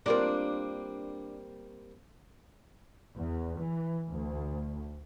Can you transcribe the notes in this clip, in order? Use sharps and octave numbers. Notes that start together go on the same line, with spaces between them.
G3 A#3 C4 D4 F4 A#4
E2
E3
D2